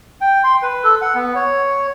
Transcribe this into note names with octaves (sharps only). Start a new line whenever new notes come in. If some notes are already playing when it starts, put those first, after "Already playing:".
G5
C6
B4
A4
F#5
B3
C#5